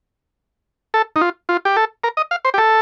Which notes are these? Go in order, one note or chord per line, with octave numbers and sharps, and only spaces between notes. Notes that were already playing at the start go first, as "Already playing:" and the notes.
A4
D#4
F4
F4
G4
A4
A#4
D#5
F5
C5
G4
A4